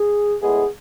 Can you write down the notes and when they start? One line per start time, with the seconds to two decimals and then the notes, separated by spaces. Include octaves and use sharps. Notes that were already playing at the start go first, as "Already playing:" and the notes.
Already playing: G#4
0.40 A2 G#3 B3 G#4